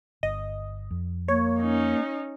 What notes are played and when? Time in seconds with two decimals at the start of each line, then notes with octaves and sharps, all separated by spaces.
0.23 G1 D#5
0.91 F2
1.28 A#3 C#5
1.60 C#4 D#4